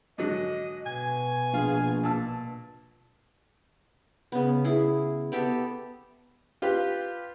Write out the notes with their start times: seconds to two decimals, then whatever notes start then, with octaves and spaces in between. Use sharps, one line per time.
0.18 G#2 D3 F#3 D#5
0.86 B2 G#5
1.54 A#1 F4 G#4
2.04 A#2 A5 E6
4.32 C#3 B3
4.65 E4 G#4
5.32 B3 G4 A4 G5
6.62 F4 G4 B4